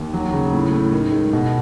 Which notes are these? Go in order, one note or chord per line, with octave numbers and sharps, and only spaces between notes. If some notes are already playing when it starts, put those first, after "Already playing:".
Already playing: D#2
F#3
C#3
A2
A2
D#3
G#3
B2